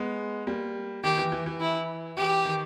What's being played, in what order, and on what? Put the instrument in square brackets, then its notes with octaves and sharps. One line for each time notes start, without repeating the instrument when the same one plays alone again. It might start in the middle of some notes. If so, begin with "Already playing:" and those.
Already playing: [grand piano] G#3 B3
G3 A#3
[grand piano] D#3 [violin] G4
[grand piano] E3
E3
E3
[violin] E4
[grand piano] E3 [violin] G4
[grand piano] D#3